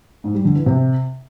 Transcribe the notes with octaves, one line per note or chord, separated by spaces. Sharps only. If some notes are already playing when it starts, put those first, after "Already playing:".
G#2
G3
D3
E3
C3